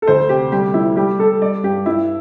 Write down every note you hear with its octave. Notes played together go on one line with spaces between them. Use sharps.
A4
D2 C5
C3 G4
G3 G4
G3 E4
G3 G4
G3 A4
G3 D5
G2 G4
G2 E4